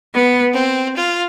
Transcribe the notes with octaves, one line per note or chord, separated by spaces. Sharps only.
B3
C4
F4